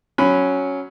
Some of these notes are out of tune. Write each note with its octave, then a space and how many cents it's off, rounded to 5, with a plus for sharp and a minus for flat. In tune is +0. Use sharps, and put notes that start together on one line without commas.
F#3 +0 C#4 +0 B5 +10